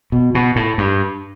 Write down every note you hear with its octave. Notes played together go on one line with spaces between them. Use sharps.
B2
B2
A2
G2